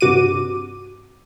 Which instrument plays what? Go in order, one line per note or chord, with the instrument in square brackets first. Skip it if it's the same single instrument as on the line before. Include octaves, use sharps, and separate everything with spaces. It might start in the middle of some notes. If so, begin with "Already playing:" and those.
[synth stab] G2 C3 F#4 D6 D#7